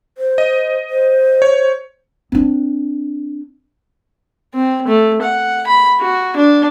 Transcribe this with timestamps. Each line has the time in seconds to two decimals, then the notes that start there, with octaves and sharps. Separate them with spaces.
0.18 C5
0.38 D#5
0.90 C5
1.42 C#5
2.32 C4 D4
4.54 C4
4.88 A3
5.22 F#5
5.67 B5
6.01 F#4
6.37 D4